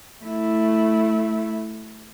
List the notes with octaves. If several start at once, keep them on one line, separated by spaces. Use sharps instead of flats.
A3 E4